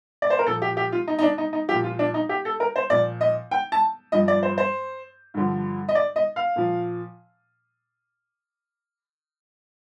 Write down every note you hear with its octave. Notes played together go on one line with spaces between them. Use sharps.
D5
C5
A#4
A#2 F3 A4
G4
G4
F4
D#4
D#4
D4
D#4
D#4
F3 G4
A#2
F4
D4
D#4
G4
A4
A#4
C5
A#2 F3 D5
D#5
G5
A5
G2 F3 D#5
D5
C5
C5
G2 D3 F3
D#5
D5
D#5
F5
A#2 F3